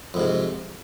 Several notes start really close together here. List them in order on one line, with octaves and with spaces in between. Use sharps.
F2 G#2 C3